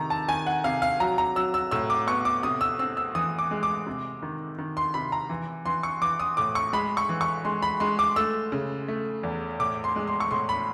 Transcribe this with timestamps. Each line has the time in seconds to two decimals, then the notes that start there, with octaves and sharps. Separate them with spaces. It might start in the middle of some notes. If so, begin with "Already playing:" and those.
Already playing: C3 D#3 A#5
0.10 A5
0.28 D#3 G#5
0.47 F#5
0.64 C3 F5
0.82 F5
1.00 F#3 A#5
1.18 A#5
1.36 F#3 E6
1.54 E6
1.71 A2 E6
1.90 D6
2.07 B3 C#6
2.25 D6
2.43 C3 D#6
2.61 E6
2.79 C4 E6
2.97 E6
3.15 E3 D#6
3.39 D6
3.51 G#3
3.63 D6
3.86 C3
4.22 D#3
4.58 D#3
4.77 C6
4.94 C3 B5
5.12 A#5
5.30 E3
5.66 E3 C6
5.83 C#6
6.01 E3 D6
6.20 D#6
6.37 A2 D6
6.55 C#6
6.73 G#3 B5
6.97 C#6
7.09 E3
7.21 C#6
7.45 G#3 C6
7.62 B5
7.80 G#3 C6
7.99 D6
8.16 A3 E6
8.52 C#3
8.88 A3
9.23 E2
9.60 A2 D6
9.84 C6
9.96 G#3
10.07 C6
10.20 C#6
10.31 A2 C6
10.49 B5